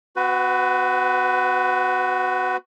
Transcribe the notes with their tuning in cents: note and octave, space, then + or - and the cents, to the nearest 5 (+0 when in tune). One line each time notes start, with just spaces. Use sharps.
C4 -45 F#4 +0 B4 +25